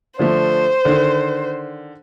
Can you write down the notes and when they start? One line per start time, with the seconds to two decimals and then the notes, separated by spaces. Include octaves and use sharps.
0.19 D3 F3 A3 C5
0.85 D3 D#3